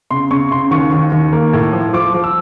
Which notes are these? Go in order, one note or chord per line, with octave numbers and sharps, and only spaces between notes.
C#3 C6
C#3 C#6
C#3 C6
D#2 C#6
D#2
D#2
A#3
A2
F3
F3 D6
F3
E6